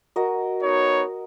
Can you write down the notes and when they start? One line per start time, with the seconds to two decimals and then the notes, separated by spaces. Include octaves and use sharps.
0.16 F#4 A#4 D#5
0.63 B3 D#4 C#5